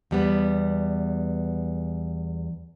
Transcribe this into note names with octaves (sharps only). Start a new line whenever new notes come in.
E2 G3 B3